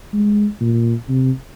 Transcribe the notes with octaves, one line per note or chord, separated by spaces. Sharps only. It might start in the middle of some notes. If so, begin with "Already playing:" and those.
G#3
A#2
C3